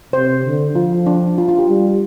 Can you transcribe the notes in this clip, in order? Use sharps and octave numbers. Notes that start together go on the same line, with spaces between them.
C3 C5
D3
F3 F4
D4
F4
F4
G4
G3